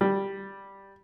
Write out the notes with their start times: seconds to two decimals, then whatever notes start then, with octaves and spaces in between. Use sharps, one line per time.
0.01 G3